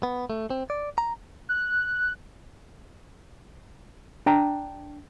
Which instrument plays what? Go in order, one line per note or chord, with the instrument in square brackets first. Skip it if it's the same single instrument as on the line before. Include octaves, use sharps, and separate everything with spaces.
[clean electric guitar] B3
A3
C4
D5
A#5
[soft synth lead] F#6
[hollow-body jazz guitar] D4 G5 A#5